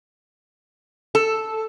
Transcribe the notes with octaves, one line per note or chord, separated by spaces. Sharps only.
A4